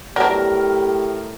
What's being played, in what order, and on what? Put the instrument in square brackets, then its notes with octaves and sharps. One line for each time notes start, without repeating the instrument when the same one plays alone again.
[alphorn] A2 [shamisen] F#3 B3 D4 [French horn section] G4 [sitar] A#4